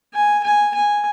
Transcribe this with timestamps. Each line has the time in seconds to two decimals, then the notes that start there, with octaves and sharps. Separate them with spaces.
0.14 G#5
0.43 G#5
0.74 G#5